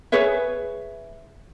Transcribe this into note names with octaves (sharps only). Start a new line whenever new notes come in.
G#4 B4 C#5 E5